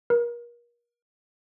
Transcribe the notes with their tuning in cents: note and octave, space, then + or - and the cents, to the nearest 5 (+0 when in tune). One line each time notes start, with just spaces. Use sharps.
A#4 +35